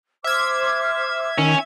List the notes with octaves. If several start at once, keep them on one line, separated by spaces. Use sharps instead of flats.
C5 E5 D6 F6 G#6
D#3 C#4